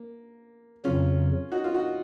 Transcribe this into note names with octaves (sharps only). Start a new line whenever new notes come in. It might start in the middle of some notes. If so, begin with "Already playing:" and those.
Already playing: A#3
F2 C#3 F#3 C#4 F4
D#4 F#4
F4
D#4 F#4